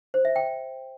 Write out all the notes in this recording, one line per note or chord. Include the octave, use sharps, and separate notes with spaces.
C5
E5
G5